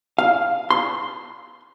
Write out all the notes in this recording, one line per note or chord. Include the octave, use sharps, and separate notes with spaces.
F5
C6